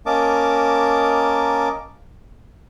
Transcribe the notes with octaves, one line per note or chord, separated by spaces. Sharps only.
A#3 C#4 A#4 D#5 A5 D6